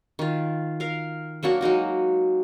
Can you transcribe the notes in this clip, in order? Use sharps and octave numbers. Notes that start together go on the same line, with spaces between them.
D#3 F4
A#4 F5
F#3 A#3 D4 F#4
F#3 G#3 D#4 F#4